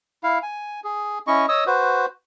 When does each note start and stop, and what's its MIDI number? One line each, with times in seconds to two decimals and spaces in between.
0.23 0.39 64
0.23 0.39 77
0.43 0.80 80
0.84 1.19 68
1.27 1.46 61
1.27 1.46 64
1.27 1.46 75
1.27 1.46 85
1.49 1.64 73
1.49 1.64 75
1.49 1.64 87
1.49 1.64 88
1.66 2.06 66
1.66 2.06 71
1.66 2.06 72